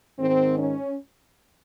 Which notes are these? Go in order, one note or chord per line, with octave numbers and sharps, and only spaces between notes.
G#2 D#3 C4
C#4